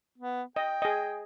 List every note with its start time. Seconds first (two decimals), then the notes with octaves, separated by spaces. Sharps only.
0.18 B3
0.56 D#5 G5
0.82 G#4 D#5